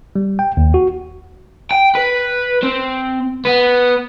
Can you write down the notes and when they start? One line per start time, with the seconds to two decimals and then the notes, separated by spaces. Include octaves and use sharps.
0.16 G3
0.39 G5
0.57 D#2
0.74 F#4
1.71 G5
1.95 B4
2.63 C4
3.45 B3